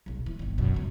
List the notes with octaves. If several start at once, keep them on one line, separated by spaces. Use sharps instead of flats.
D#1 B1
E3
G1 D#3
F#2 B2
C#2 C#3